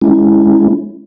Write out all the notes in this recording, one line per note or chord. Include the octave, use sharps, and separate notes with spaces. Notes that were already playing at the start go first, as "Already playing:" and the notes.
G#3 C#4 E4